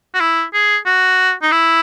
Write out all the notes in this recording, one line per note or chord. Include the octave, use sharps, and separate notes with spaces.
F#4
E4
G#4
F#4
D#4
E4